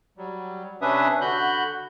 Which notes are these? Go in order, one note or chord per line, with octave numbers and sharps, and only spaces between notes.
F#3 G3
C3 C#4 D4 B4 E5 D#6
D3 F#4 B5 F#6 G6